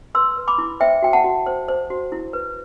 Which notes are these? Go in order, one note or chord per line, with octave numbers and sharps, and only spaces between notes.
B4 C6 E6
B4
B5 D6
E4
C5 E5 G5
F#4 G5
F#5 A5
F#4
C5
C5
F#4
E4
B4